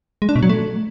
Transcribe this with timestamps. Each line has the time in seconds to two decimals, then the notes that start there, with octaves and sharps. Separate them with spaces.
0.22 G#3
0.29 D4
0.36 B2
0.43 F#3
0.49 A3